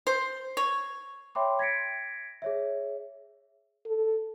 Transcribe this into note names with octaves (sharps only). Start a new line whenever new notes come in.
C5
C#5
C#5 E5 G5 B5 C6 D6
G#6 A#6 B6 C#7 D7
G#4 C#5 E5
A4